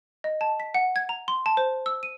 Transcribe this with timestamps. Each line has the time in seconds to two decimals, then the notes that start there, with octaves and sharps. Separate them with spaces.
0.24 D#5
0.41 A5
0.60 B6
0.74 F#5
0.96 G#6
1.09 A#5
1.28 C6
1.46 A5
1.57 C5
1.86 E6
2.03 D#7